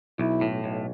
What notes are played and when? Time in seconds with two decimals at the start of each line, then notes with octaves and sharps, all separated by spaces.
0.19 B1 E4
0.41 A2
0.64 B1